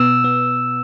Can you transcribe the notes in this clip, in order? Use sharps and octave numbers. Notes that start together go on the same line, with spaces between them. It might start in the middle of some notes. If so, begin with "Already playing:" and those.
Already playing: B2 B3 E6 E7
B3